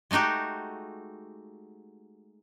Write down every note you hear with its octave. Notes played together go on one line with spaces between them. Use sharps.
G#3 A3 D#4 F#4 G4